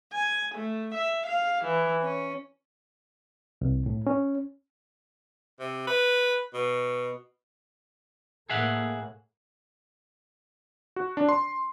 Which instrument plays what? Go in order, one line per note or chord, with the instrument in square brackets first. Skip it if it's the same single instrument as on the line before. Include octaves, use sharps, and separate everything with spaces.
[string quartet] G#5
A3
E5
F5
E3
C#4
[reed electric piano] C2
A2
C#4
[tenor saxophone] C3
B4
B2
[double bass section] A2 A#3 [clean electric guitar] G#4 E5 F#5
[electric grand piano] F#4
D4
C6